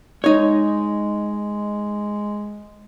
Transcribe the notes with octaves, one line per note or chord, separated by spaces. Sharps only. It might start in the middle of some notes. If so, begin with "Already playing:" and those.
G#3 D#4 C#5